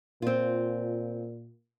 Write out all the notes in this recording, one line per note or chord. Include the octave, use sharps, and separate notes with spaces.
A#2 C4 F4